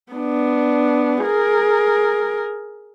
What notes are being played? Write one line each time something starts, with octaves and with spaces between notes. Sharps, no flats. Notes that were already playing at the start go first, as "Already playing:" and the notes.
B3 D4
G#4 A#4